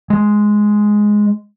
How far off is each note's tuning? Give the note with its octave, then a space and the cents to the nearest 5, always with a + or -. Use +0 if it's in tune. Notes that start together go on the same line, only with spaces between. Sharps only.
G#3 +5